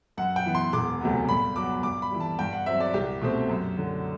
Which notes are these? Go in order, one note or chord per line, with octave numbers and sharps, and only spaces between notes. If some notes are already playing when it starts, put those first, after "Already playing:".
F#2 F#5
G5
E3 B3
C6
E1 D6
D2 C3 F#3 B3
G2 B5
F#3 B3 D6
G2 D6
B5
E3 G3
A5
G2 G5
F#5
F#3 C4 E5
D5
C2 G4
B2 A3 C4
F#2
D3 F#3